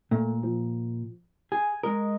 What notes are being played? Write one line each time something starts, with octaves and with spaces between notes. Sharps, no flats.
A#2 A3
F3
G#4 G#5
G#3 A#4 D#5